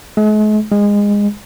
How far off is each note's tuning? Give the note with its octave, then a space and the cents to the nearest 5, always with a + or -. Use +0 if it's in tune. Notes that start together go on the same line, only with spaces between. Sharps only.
G#3 +45
G#3 -20